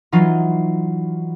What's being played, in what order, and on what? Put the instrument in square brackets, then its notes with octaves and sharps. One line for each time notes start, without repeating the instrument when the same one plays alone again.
[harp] E3 F#3 D#4 F4